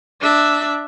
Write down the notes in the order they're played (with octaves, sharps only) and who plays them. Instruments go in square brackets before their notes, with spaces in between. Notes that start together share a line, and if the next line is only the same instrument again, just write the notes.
[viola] D4 E5